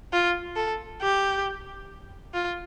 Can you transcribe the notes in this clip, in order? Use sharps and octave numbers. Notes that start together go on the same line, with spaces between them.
F4
A4
G4
F4